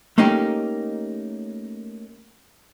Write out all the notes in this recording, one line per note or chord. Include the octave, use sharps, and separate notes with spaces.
A3 A#3 C#4 D#4 G4 A#4